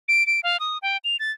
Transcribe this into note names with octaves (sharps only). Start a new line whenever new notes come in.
D7
D7
F5
D#6
G5
F7
A6